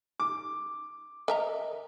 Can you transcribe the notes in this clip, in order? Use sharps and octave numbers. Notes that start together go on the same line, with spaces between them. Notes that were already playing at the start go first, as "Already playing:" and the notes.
D6
A#4 D#5 E5 A#5